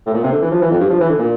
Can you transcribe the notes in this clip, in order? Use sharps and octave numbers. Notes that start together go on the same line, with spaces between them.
A2
A#2
C3
D3
E3
F3
E3
F2
G2
F3
E3
D3
A#2